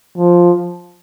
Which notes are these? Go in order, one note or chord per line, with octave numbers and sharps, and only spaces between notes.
F3